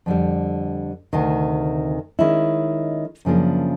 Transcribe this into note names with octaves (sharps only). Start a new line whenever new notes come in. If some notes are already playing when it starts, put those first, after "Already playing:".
F2 D3 G3
D2 C3 D#3
D#3 G#3 C#4 E4
F#2 C#3 F3 A#3 D4